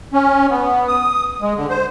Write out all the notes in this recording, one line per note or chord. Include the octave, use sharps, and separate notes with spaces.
C#4
B3
D#6
G#3
D3
C5